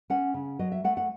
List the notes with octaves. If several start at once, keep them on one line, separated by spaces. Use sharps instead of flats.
C#4 F#5
C#3
F#3 D#5
E5
A3 F#5
F#5